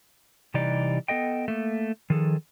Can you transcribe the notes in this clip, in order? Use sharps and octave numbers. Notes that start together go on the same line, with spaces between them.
C3 E3 G3 D#4 D5
B3 A4 D#5 G5
A3 A#3
D#3 F3 G#4 A4